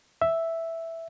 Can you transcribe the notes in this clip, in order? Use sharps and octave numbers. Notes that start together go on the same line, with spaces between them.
E5